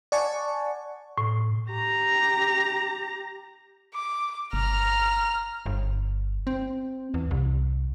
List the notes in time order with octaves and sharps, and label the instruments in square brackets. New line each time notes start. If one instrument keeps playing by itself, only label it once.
[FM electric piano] D5 F#5 G#5 A5 C#6
[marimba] A2
[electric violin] G4 A#5
[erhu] D6
[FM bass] G1 [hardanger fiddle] A#5 [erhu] F6
[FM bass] G1
C4
E2
C2